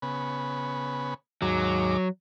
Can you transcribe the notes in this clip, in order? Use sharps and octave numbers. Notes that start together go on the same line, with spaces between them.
C#3 B3
D#2 G#2 F#3 D6